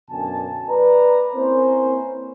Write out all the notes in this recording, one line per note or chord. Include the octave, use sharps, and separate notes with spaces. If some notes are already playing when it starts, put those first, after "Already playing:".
F#2 B2 D3 G#5 A5
B4 D5 A#5
A#3 C4 C#4 E4 A#4 C5